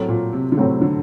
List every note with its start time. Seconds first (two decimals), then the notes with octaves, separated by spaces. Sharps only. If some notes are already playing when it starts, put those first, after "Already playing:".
Already playing: A2 F#3 A3 C4
0.09 A#2
0.33 C3
0.52 D3
0.57 A2 C3 F#3 A3 C4
0.82 D3